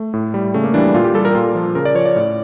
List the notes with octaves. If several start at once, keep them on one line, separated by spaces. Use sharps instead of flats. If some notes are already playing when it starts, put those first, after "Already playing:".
Already playing: A3
A2
G3
C#3 A3
A#3
E3 G3 D4
A#2 F4
G4
G3 A4
A#4
A#2 F4
F3
C#3 A#4
D5
F3 C#5
D5
A2